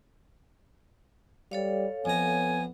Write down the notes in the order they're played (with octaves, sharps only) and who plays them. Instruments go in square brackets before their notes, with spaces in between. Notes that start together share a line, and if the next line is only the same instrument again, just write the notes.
[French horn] G3 [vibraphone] A4 C#5 F5
[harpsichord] F2 A#5 [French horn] B3 [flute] G#5